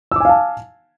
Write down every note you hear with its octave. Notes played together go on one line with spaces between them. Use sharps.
F5 G#5 A5 D6 E6